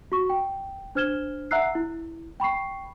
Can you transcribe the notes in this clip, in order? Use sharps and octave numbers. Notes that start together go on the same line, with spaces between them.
F#4 C#6
G5
D4 C5 F6 G#6 E7 G7
E5 F#5 A#5 E6 F#6 C7
E4
G5 B5 C#6 C7